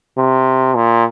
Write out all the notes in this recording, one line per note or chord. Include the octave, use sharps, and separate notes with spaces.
C3
A#2